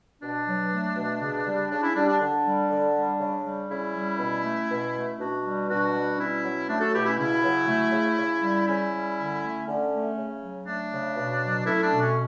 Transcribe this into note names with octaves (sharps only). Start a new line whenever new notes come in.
B2 D4
F#3
A3
B2
C#3
G3
C#3 D4
C#4 E4
G3 D4
D4
D3 D4
G3
D3
G3
C#3
G3
C#3 C#4 E4
G3
B2
A3
B2
A3
B2 D4 F#4
G3
B2 D4 F#4
G3
B2 C#4 E4
F#3
A3 D4
F#4 A4
B2 E4 G4
C#4 E4
C#3 C#4 E4
F#3
A3
C#3
C#3
G3
C#3 C#4 E4
G3
D3
A3
D3 C#4
A3
C#3
F#3
A3 D4
C#3
B2
F#3
A3 C#4 E4
D4
B2
C#4